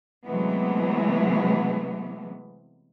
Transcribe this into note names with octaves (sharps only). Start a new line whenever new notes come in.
C3 E3 F#3 G#3 A3 B3